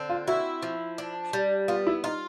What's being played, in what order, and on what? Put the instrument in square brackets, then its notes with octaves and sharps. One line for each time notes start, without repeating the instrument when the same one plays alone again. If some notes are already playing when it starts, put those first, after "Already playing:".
Already playing: [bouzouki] D3 C4
[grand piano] F4
[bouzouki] E4 [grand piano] F#4
[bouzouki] F3
D4
G3
[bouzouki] B3 [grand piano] F4
[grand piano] E4
[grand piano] D#4 [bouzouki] F4